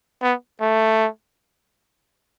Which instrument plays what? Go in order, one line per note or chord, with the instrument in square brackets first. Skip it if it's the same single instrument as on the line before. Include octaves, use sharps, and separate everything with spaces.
[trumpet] B3
A3